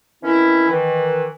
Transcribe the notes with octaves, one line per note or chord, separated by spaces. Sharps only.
D#3 E3 C4 C#4 E4
D#3 E3